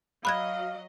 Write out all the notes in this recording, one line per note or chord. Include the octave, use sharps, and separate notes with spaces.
F#3 D#5 F5 B5 F#6 G#6